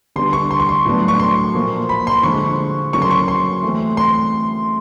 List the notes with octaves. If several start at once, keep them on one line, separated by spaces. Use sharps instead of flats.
D3 G3 B3 D4 C6
C#6
C6
C#6
C6
A2 F#3 B3 D4
C#6
C6
A#2 F3 A#3
B5
C6
D3 F3 G#3 C#6
C#3 F#3 A#3 C#4 C#6
C6
C#6
C6
E3 A3 C4
C6